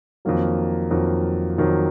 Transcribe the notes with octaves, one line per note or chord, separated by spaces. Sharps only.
F2 D#3 F#3 A#3
F2 D#3 F#3
F2 D#3 F#3